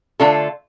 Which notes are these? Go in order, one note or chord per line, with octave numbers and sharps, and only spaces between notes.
D3 A3 D4 F4 A4